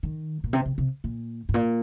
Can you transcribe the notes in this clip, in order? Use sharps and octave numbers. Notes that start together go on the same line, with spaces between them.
D#3
A#2
C3
C3
C3
A#2
G#2
A#2